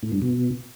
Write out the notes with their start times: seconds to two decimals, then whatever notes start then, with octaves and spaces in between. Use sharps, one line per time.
0.03 A2
0.12 G2
0.22 B2